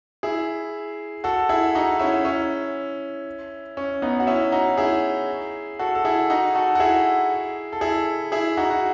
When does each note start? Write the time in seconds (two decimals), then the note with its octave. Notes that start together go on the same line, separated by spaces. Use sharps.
0.23 E4 G#4
1.24 F#4 A4
1.49 E4 G#4
1.75 D#4 F#4
1.99 C#4 E4
2.25 C#4 E4
3.77 C#4
4.02 B3 D#4
4.20 F#4
4.27 C#4 E4
4.52 D#4 F#4
4.78 E4 G#4
5.79 F#4 A4
5.95 A4
6.05 E4 G#4
6.30 D#4 F#4
6.55 F#4 A4
6.75 F#4
6.80 E4 G#4
7.73 A4
7.81 E4 G#4
8.32 E4 G#4
8.57 D#4 F#4
8.70 F#4